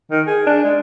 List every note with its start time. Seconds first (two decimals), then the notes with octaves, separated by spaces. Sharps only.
0.11 D#3
0.27 G#4
0.47 D4
0.64 G#3